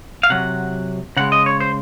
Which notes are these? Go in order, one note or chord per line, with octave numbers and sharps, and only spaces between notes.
F5
C3 F#3 F#5
C#3 G#3 F#5
D#5
C#5
C5